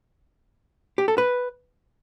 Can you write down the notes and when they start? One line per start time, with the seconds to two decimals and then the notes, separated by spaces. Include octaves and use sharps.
0.98 G4
1.08 A4
1.18 B4